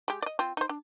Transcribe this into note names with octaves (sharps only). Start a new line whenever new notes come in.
G#3 G4
D5 D#5
C4 F4
D#4 C5
D4